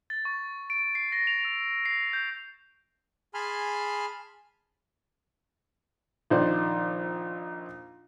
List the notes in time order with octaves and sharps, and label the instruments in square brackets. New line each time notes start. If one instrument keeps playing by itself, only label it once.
[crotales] A6
C#6
D7
C7
A#6
F7
E6
C7
G6
[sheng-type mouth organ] G#4 G#5 A5 B5 C6 F6
[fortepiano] A#1 D#3 C5 D5